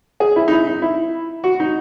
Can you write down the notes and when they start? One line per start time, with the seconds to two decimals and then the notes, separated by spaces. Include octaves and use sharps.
0.20 G#4
0.36 E4
0.48 D#4
0.52 E4
0.67 D#4
0.82 E4
1.44 F#4
1.60 D#4